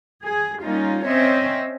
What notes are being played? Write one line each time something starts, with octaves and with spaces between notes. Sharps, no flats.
G#4
G3 A#3 C#4 D#4 F4
C4 C#4 C5 C#5 D#5 E5